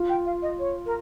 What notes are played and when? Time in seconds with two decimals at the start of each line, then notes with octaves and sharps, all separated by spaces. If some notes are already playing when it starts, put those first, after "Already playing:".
Already playing: F4
0.09 G5
0.26 F5
0.42 D#5
0.59 C#5
0.86 A#4